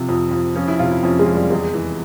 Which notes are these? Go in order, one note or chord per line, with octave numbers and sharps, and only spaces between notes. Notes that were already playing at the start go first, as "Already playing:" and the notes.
Already playing: C3 F3
F2
F2
F3 C#4
E4
C3 F4
E4
F2 C#4
G#3
F2
G3
E2 G#3
E3